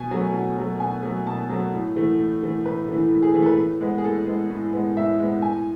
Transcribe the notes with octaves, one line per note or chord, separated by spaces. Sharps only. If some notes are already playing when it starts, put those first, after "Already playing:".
Already playing: B2 G#5
F#3 A3
B2
F#3 A3
B2 G#5
F#3 A3
B2 A5
F#3 A3
A2
E3 A3
A2
E3 A3
A2 B4
E3 A3
A2
G#4
E3 A3 G#4
A4
B4
A2
G#3 B3
G#4
A2 A4
G#3 B3
A2
G#3 B3
A2 E5
G#3 B3
A2 G#5